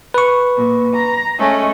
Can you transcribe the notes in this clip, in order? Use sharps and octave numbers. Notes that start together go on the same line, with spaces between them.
B4 C#6
A#2
A#5
G#3 A3 C#4